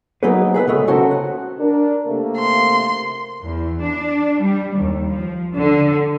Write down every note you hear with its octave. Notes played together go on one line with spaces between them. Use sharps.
F#3 A#3 B3 D#4 G#4 B4
G#4 B4 E5 F#5
C#3 G#3 A3 B3
C#3 C#4 F#4 A4 A#4 C5
F#5
D4 A#4
C3 A3 A#3
C6
E2
D4
G3
D#2
F3
D3